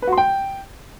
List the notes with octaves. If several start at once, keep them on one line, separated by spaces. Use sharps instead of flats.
B4
F#4
C6
G5